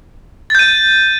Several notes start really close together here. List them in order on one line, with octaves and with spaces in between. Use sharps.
A6 G6 D#7